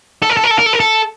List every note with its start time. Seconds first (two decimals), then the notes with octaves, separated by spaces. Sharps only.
0.22 A4
0.30 A#4
0.37 A4
0.44 A#4
0.51 A4
0.59 A#4
0.66 A4
0.73 A#4
0.80 A4